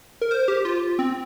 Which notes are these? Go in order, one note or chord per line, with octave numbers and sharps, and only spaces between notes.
A#4
C5
G4
F4
C4